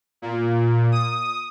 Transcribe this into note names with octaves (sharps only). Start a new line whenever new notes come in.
A#2
D#6